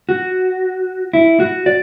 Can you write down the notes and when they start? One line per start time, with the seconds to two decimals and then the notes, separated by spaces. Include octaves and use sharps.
0.09 F#4
1.13 E4
1.40 F#4
1.66 D5